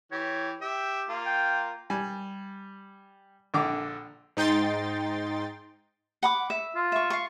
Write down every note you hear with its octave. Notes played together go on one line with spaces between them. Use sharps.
E3 G4 C#5
G4 E5 G5
A#3 F4
G5
G3 G#5
A#1 D3 D6
G#2 D#4 G5 C6 A6
F#5 B5 D6
E5
F4
E5 C#6
F5 C#6